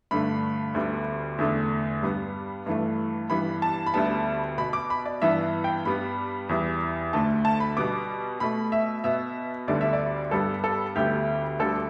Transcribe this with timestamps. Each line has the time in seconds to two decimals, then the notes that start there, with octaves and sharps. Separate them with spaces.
0.11 G2 D3 A3 B5
0.75 D2 D3 G3 B3
1.38 E2 D3 A3
2.03 G2 G3 B3
2.66 G2 E3 A3
3.30 G2 E3 G3 B3 B5
3.62 A5
3.86 B5
3.94 D2 D3 G3 B3 A5
4.58 B2 B3 B5
4.73 D6
4.90 B5
5.06 D5
5.22 G2 E3 B3 E5
5.64 G5
5.85 G2 G3 B3 B5
6.49 E2 E3 G3
7.13 D2 D3 A3 A5
7.45 A5
7.60 B5
7.77 B2 G3 B3 D6
8.40 B2 A3 B5
8.72 E5
9.04 B2 B3 E5
9.68 D2 D3 G3 B3 D5
9.81 E5
9.93 D5
10.31 G2 G3 B3 A4
10.64 A4
10.96 D2 D3 G3 B3 G4
11.59 D2 D3 G3 A4